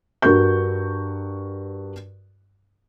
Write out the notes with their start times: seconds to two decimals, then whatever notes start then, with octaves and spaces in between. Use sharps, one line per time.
0.22 G2 F#4 A#4 C#6 G6